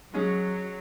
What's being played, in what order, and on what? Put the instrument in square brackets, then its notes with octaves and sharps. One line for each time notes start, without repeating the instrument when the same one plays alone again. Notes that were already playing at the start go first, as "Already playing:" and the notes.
[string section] F#3 [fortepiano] G#3 C#4 G#4